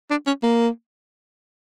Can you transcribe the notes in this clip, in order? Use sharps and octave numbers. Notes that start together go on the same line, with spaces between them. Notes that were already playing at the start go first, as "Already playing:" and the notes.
D4
C#4
A#3